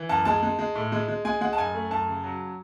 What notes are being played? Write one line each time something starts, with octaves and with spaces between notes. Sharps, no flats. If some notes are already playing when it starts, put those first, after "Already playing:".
Already playing: E3
F#2 A5
G#3 A5
G#3
G#3
A2
G#3
G#3
G#3 G#5
G#3 F#5
A5
F#2 G#5
A3
F#2 A5
C#3
F#3